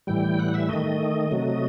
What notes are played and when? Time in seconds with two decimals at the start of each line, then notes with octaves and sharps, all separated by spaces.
0.07 A2 E3 G3 G5
0.39 F#5
0.54 E5
0.69 D#3 A3 D#5
1.31 C3 F#3 A3